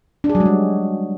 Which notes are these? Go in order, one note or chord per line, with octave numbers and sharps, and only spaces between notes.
D4
G#4
F#3
G#3
G3